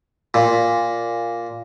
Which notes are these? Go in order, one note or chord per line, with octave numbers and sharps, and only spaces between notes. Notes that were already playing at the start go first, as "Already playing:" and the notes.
A#2